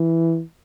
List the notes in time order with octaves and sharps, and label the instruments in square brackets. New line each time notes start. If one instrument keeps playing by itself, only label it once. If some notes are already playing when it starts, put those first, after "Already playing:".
Already playing: [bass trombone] E3